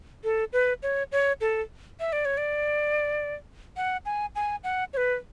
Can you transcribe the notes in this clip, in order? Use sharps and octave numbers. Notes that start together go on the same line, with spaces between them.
A4
B4
C#5
C#5
A4
E5
D5
C#5
D5
F#5
G#5
G#5
F#5
C#5
B4